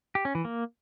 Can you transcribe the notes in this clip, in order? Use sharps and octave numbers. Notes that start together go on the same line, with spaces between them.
G4
C#4
E3
A#3